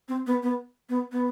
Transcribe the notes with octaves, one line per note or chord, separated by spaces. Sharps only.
C4
B3
B3
B3
B3